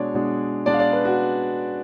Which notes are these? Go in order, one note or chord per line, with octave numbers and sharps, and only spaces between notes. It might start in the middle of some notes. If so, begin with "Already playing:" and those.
Already playing: B2 G#3 D4 C#5 D5
B2 G#3 D4
B2 G#3 D4 D5
F5
D5
B4
F#4